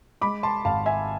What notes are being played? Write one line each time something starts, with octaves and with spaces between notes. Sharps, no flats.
G#3 B5 D6
A5 C6
G#1 F5 A5
E5 G#5